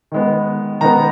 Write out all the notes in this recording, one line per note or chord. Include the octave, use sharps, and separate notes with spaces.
D#3 G#3 B3
D#3 G#3 B3 A#5